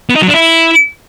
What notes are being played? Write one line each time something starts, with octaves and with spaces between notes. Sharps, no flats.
B3
D#4
F#3
D4
E4